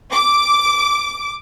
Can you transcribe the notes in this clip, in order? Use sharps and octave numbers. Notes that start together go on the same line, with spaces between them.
D6